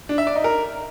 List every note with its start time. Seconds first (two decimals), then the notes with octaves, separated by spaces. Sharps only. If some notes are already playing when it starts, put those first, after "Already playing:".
0.09 D4
0.18 E5
0.27 D5
0.36 D#4
0.44 A#4